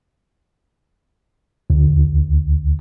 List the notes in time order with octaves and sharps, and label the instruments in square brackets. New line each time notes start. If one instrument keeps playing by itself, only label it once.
[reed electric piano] D2